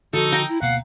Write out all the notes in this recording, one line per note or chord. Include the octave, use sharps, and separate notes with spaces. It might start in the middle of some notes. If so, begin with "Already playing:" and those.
D3 D#3 F3 D#4 F#4 A4
G5 A#5
E4
D2 B2 A#3 F5 F#5